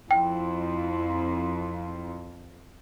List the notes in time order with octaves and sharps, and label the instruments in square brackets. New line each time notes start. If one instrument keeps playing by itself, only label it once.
[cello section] F2 [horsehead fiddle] E4 [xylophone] G5